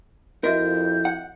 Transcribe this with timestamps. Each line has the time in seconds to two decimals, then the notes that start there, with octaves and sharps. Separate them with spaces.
0.44 F2 E4 F#4 A#4 D#5 E5 G6
1.05 F#5